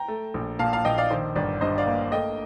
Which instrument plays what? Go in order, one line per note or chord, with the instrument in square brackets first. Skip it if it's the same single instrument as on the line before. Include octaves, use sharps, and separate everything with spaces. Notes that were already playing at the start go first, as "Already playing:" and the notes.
Already playing: [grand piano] G5 A#5
A3
A#1
A#2 F5 A5
F5 A5
A#1 D#5 G5
D5 F5
D#3 C5
G1 D5
G2 C5 D#5
D5 F5
A#3
A3 D#5 G5